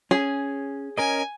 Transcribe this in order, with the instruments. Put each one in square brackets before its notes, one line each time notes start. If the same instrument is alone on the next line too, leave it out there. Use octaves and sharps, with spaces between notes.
[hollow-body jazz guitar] C#4 [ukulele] G#4
[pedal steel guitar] C#4 A#4 D#5 [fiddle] G#5